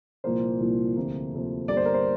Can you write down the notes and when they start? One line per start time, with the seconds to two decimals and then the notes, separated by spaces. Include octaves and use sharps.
0.24 C2 A#2 F3 A#3 C5
0.60 C2 A#2 F3 A#3
0.96 D2 C3 F3 A#3
1.32 D2 C3 F3 A#3
1.68 G1 G2 G3 A#3 D5
1.77 C5
1.85 A#4
1.94 C5